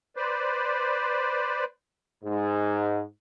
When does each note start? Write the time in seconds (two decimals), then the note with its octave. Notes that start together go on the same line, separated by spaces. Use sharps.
0.16 B4 C5 D5
2.24 G#2